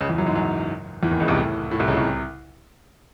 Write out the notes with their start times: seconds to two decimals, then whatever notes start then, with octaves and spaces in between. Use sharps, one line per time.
0.01 C#2 C#3
0.09 E2 E3
0.18 F#2 F#3
0.26 G#2 G#3
0.35 F#2 F#3
1.03 E2 E3
1.11 D#2 D#3
1.20 C#2 C#3
1.28 C2 C3
1.37 A2
1.71 A2
1.79 C2 C3
1.88 C#2 C#3
1.97 C2 C3